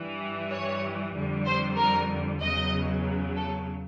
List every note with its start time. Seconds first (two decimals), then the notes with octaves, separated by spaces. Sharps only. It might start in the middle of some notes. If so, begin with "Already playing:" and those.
Already playing: G2 E3 G3
0.49 C#5
1.12 F2 D3 G3
1.45 C5
1.76 A#4
2.40 E2 C#3 F#3 D#5
3.36 A4